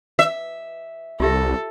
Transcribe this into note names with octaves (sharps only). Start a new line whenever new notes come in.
E5
C2 F4 G4 A4 E5